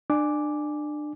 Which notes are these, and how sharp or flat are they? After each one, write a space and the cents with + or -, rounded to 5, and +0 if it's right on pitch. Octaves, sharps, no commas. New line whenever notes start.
D4 +25 G#5 +0 D6 +0